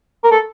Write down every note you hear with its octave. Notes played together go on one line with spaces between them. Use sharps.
A#4
A4